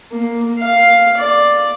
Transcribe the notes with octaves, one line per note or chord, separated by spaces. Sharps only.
A#3
F5
D5